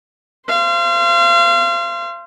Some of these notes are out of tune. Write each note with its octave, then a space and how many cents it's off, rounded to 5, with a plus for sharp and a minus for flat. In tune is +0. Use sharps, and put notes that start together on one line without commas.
C5 +0 F5 -35